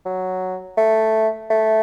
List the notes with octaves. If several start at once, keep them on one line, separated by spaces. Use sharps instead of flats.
F#3
A3
A3